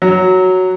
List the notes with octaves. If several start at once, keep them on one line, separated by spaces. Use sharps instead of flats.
F#3